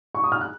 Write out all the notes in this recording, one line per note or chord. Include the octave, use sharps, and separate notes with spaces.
C#6
D#6
F6
F#6